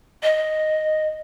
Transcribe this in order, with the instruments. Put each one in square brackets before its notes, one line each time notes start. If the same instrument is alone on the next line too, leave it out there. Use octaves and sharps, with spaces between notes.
[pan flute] D#5